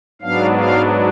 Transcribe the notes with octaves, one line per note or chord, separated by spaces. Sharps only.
G#2 F#3 B3 D4 F5
F5